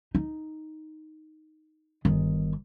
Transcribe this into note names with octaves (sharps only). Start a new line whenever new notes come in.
D#4
G1 D#3